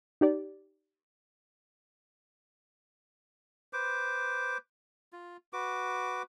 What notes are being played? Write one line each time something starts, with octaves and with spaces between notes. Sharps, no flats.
D#4 G4 D5
B4 C5 D6
F4
F#4 B4 D6